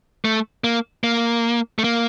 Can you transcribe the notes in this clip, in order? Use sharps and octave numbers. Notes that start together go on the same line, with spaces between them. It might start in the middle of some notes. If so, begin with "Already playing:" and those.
A3
A#3
A#3
A3
A#3